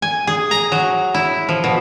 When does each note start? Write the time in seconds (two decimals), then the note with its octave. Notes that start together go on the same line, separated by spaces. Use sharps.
0.02 G#5
0.27 G#4
0.51 A#5
0.72 F#3
1.14 E4
1.49 F3
1.64 B2